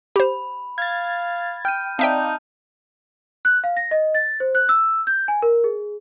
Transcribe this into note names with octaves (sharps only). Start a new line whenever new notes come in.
G4 C5 B5
F5 G#6 A6
G5 F6 G6 D#7
C4 D#4 D5 E5 F5 G5 A5 G6
F#6
F5
A#6
D#5
A6
C5
F#6
E6
G6
G#5
A#4
G#4